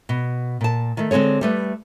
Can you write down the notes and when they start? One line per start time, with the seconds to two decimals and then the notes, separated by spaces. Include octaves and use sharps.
0.09 B2
0.61 A#2 A5
0.97 D#3 A3
1.11 D3 G#3 C4 G#4 C#5
1.41 G3 A3 B4